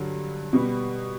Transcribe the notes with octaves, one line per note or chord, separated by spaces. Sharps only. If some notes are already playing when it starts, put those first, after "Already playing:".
Already playing: G2 D3 F#3
B2 G3 B3